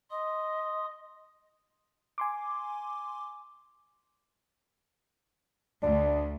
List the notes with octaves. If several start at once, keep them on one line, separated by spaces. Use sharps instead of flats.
D#5 C6 D#6
G#5 C6 D6
D2 D4